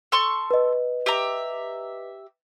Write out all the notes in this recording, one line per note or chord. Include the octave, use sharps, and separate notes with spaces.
A4 C6 C#6
B4 D#5
G4 E5 A#5